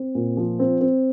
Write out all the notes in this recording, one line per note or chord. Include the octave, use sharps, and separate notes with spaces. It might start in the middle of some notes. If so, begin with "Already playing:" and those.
Already playing: C4
A#2
F3
C4
C4